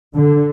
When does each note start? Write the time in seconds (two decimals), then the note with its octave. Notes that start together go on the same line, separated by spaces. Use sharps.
0.15 D3